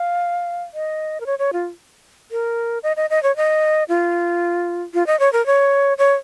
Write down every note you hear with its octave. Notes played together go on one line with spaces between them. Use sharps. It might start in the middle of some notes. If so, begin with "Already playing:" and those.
Already playing: F5
D#5
A#4
C#5
C#5
F4
A#4
D#5
D#5
D#5
C#5
D#5
F4
F4
D#5
C#5
A#4
C#5
C#5